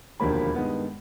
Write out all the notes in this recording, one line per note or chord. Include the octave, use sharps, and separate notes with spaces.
E1 D#2 D3 F3 A#3 B5
G2 D#3 G#3 B3